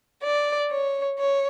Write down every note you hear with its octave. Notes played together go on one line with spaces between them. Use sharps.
D5
C#5
C#5